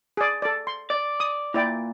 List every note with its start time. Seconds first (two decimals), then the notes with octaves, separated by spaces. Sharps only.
0.17 G#4 D5
0.42 A4 D5
0.67 C6
0.90 D5
1.20 D#6
1.54 A#2 E4 D5 G5